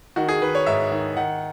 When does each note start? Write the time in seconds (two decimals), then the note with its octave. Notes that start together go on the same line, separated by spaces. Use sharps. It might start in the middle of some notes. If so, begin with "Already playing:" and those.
0.16 D#3 F#4
0.29 G#4
0.42 D#3 B4
0.55 C#5
0.66 G#2 E5
0.91 D#3
1.17 D#3 F#5